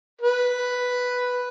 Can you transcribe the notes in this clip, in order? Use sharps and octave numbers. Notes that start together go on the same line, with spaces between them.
B4